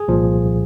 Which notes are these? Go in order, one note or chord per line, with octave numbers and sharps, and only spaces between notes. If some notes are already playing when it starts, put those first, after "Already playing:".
Already playing: G#4
C2 A#2 F3